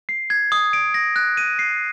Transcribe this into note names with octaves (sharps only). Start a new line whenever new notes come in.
C7
G#6
D#6
D7
A#6
F#6
D#7
C7